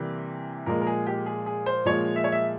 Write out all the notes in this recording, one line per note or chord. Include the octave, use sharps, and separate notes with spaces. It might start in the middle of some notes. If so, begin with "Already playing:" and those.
Already playing: C3 E3 G3 A#3
A#2 F3 G#3 A#4
A#4
G#4
G4
G#4
G#4
C5
A#2 F3 G#3 C#5
E5
C#5
E5